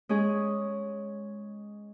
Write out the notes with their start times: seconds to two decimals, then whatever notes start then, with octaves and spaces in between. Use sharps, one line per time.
0.09 G#3 C#4 G#4